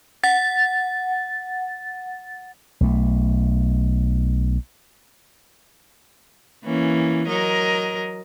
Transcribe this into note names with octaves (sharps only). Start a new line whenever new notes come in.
F#5 A6
B1 A3
E3 A#3 C#4
F#3 A#4 D#5